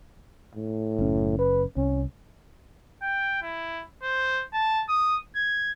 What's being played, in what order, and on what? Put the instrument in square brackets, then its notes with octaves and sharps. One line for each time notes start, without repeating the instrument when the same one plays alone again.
[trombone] A2
[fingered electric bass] F#1 C#4
[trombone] B4
[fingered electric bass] C2 [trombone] C#4
[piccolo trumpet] G5
E4
C5
A5
D#6
G#6